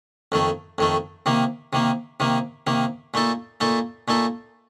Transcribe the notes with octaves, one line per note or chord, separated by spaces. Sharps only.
F2 D#3 A3
F2 D#3 A3
C3 D#3 A#3
C3 D#3 A#3
C3 D#3 A#3
C3 D#3 A#3
A#2 A3 D#4 A4
A#2 A3 D#4 A4
A#2 A3 D#4 A4